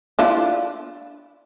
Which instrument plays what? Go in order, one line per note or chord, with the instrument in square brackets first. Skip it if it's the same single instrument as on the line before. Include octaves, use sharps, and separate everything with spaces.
[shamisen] D4 E4 F4